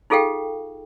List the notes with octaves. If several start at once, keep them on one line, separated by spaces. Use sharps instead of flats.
D#4 F4 G#4 A4 F5 G5